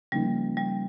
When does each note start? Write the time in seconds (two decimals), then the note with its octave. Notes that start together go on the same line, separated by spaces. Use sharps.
0.12 C#3 F3 G3 A#3 D#4
0.57 G3